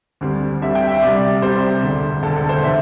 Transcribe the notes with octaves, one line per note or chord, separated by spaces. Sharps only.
D2 D3 G3 C4
D2 D3 G3 C4 E5
G5
E5
C2 C3 G3 D5
C2 C3 G3 C5
E1 D2 D3
E1 D2 D3 A4
A4
C5
C3 E3 C4 E5